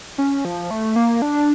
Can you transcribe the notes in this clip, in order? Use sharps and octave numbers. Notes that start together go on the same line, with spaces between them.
C#4
F3
A3
A#3
D4